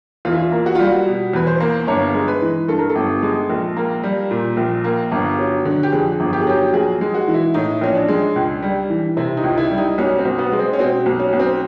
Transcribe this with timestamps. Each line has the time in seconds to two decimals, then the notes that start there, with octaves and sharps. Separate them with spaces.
0.25 E2 F4
0.32 E4
0.39 F4
0.52 A#3
0.66 F#4
0.75 G3 F4
0.85 F#4
1.06 B2
1.33 E2 B4
1.47 C5
1.60 A#3
1.87 G1 C#5
2.14 G#3
2.28 B4
2.41 E3
2.68 G2 A4
2.79 A#4
2.89 A4
2.95 G1
3.23 G#3
3.50 A#1
3.76 A#3
4.03 G3
4.31 A#2
4.57 A#1
4.84 A#3
5.12 G1
5.39 F#3
5.65 D3
5.83 G4
5.93 F2 G#4
6.20 G1
6.33 G4
6.41 G#4
6.47 F#3 G4
6.73 A#1 G#4
7.01 G#3
7.14 F#4
7.28 E3
7.34 E4
7.54 A2 D#4
7.81 A#1 C#4
7.95 D4
8.08 G#3
8.36 C#2
8.63 G3
8.90 E3
9.17 C3 E4
9.37 D#4
9.44 C#2
9.58 E4
9.71 G3
9.78 D#4
9.98 B1 C#4
10.19 C4
10.25 B1
10.38 B3
10.52 G#3
10.59 C4
10.73 C#4
10.79 B2 C4
11.06 B1
11.19 C#4
11.33 B1
11.40 C4